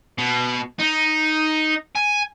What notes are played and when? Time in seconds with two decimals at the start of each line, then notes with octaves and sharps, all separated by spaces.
0.18 B2
0.80 D#4
1.96 G#5